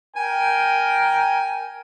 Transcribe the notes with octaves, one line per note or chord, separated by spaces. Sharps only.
A#4 G5 G#5